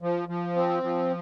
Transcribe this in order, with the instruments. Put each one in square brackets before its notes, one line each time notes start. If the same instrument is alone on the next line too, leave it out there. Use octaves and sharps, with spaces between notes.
[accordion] F3
F3
C4
F3